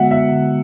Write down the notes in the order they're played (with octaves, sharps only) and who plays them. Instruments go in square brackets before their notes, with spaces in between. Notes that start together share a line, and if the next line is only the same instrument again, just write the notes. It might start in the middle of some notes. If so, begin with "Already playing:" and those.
Already playing: [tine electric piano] D3 G#3 B3 F#4 [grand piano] E5 F#5
[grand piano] E5
[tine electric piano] D3